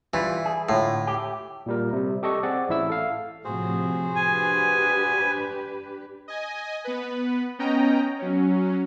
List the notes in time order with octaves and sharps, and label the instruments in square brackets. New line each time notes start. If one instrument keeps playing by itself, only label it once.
[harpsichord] E3 [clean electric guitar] G3 F4
[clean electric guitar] G#4
[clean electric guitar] D2 F4 [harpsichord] A2
[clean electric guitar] G4
[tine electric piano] A#2 G3 A#4
C3 G3
G4 A4 D#5 C#6
C4 G#4 D5 F#5
A1 A2 E4 E5 E6
A4 F5
[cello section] A2 C3 F3 [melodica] F#4 G#4 C5
[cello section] D4 G4 B4 [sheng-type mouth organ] G#5
[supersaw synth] D#5 G#5
B3 B4
B3 C#4 D#5 G5 A#5
F#3 C#4